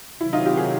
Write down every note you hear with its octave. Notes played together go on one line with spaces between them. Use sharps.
C3 D#3 F#3 E4
D#4 F4
F4 G4
F#4 G#4